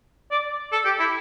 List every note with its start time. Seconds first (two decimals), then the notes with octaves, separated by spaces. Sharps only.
0.31 D5
0.72 A4
0.85 G4
0.99 E4